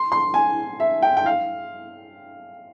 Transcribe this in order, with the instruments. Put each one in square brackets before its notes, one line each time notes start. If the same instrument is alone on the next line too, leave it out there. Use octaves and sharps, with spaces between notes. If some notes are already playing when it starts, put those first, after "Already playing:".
Already playing: [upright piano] C6
C6
G#5
E5
G5
G5
F5